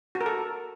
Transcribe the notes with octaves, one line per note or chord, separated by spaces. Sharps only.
F#4
A#4
A4